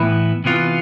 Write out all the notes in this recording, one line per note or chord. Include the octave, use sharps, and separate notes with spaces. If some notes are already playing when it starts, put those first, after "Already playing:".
Already playing: A2 E3 B3 E4
C3 E3 B3 F4